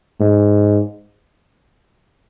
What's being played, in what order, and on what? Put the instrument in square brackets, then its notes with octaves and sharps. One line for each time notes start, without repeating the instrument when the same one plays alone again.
[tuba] G#2